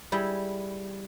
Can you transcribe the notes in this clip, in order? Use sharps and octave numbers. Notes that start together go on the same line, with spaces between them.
G3 E4 G#4